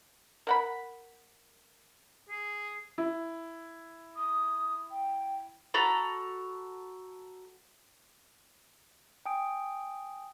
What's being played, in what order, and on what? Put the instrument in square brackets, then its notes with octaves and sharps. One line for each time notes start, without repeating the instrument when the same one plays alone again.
[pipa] A#4 F#5 B5
[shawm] G#4
[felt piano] E4
[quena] D#6
G5
[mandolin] F#4 A4 A#5 B5
[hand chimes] G5 G#5 D#6 D7